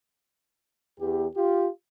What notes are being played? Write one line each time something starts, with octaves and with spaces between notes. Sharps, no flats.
E2 G4
F4 G4